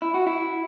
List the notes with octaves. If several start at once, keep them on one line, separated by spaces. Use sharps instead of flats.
E4
F#4
E4